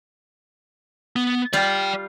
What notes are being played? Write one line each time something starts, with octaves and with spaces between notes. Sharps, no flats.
B3
G3 F4 D5 G5